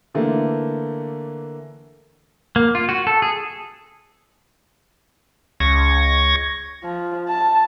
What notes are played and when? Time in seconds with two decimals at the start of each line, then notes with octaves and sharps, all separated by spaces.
0.14 D3 E3 A3 A#3
2.56 A#3
2.75 F4
2.89 F#4
3.07 A4
3.22 G#4
5.60 C#2 C#6 G#6 A#6
6.84 F3
7.29 A5